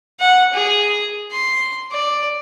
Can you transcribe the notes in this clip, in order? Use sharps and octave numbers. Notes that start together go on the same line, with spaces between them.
F#5
G#4
C6
D5